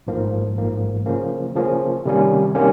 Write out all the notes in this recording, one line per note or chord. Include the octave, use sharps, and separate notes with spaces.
A1 G#2 F3 A#3
A1 G#2 F3 A#3
C#3 F3 A#3 C#4
C#3 F3 A#3 C#4
C3 D#3 G3 A#3 C#4
C3 D#3 G3 A#3 C#4